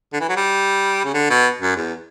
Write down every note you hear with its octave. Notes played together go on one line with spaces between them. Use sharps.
D3
E3
F#3
G3
C#3
D3
B2
F#2
E2